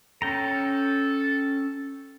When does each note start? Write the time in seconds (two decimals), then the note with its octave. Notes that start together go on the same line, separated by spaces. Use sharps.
0.22 C#4 A4 G5 A#5